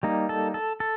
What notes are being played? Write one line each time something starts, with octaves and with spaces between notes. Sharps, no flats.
G3 A#3 D#4
A4
A4
A4